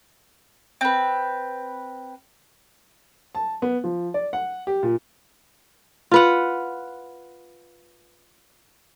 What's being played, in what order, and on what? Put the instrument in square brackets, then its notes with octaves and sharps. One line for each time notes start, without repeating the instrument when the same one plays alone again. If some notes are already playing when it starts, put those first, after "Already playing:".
[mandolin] C4 B4
[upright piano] A5
B3
F3
D5
F#5
G4
A#2
[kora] F4 B4 F#5